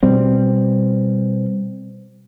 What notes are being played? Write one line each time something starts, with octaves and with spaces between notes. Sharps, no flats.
B2 G3 C4